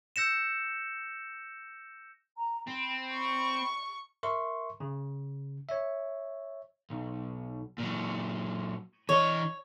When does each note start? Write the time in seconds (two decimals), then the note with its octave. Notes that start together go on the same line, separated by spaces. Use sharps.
0.16 E6 G6 A#6 C#7 E7
2.36 A#5
2.67 C4 B5
3.14 B5 C#6
4.23 A#4 E5 C6 C#6
4.80 C#3
5.69 C#5 E5
6.90 B1
7.78 A#2 F#3
9.09 E3 C#5 D#5